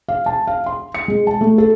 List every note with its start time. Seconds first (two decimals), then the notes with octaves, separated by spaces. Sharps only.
0.08 F5
0.26 A5
0.47 F5
0.66 C6
0.95 C#7
1.08 G#3
1.27 A5
1.41 A3
1.58 A4